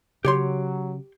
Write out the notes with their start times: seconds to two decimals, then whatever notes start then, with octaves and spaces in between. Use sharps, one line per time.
0.25 C#3 F#3 G4 C#5 C6